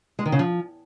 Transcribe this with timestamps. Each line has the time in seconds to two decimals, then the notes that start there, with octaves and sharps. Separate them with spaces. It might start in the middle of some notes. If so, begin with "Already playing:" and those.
0.19 G#3
0.25 D#3
0.32 C#3
0.39 F3